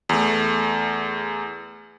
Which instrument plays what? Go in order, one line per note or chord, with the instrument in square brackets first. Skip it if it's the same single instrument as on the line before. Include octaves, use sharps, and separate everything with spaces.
[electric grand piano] E2 A3